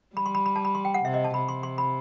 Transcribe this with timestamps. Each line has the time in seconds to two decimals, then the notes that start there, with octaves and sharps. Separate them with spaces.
0.16 G3 B5
0.26 C6
0.35 B5
0.46 B5
0.56 A5
0.65 B5
0.75 C6
0.85 G5
0.94 F#5
1.04 C3 E5
1.14 D#5
1.24 A5
1.34 C3 B5
1.49 C6
1.63 C6
1.78 B5